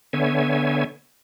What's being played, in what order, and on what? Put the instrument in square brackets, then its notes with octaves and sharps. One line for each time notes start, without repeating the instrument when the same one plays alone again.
[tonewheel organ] D3 B3 C#5 E5 G#5